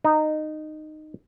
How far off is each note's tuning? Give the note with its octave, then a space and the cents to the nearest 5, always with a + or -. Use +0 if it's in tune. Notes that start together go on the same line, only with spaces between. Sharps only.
D#4 -15